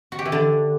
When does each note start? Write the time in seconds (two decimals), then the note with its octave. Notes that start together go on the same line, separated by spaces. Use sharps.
0.12 F#4
0.19 G4
0.25 E3
0.32 D3